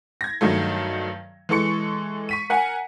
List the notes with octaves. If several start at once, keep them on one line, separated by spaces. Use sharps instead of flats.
G#6 A#6
G2 D#3 F#3 A3
E3 G#3 A4 C#6 C#7
C#6 B6 D#7
A#4 F#5 G#5